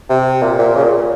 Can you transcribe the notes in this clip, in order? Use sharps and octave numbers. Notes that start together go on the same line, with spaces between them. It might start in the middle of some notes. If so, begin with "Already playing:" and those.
C3
A#2
A#2
C#3
A#2